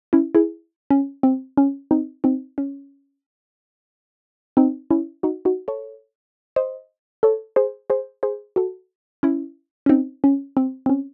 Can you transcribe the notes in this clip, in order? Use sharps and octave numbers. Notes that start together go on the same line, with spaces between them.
C#4 E4
E4 G#4
C#4
C4
C#4
C4 D#4
C4 D#4
C#4
C4 D#4
C#4 E4
D#4 F#4
D#4 F#4
A4 C#5
C5 D#5
A4 C#5
G#4 C5
G#4 C5
G#4 C5
F#4 A4
C#4 E4
C#4
C4 D#4
C#4
C4
C4
C#4